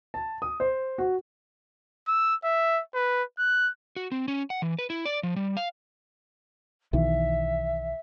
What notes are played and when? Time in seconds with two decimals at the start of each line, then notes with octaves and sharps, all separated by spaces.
0.14 A5
0.42 D#6
0.60 C5
0.98 F#4
2.08 E6
2.44 E5
2.94 B4
3.38 F#6
3.96 F#4
4.12 C4
4.28 C#4
4.50 F#5
4.62 E3
4.79 B4
4.90 E4
5.05 D5
5.23 F3
5.36 G3
5.57 F5
6.93 B1 D#3 E3 E5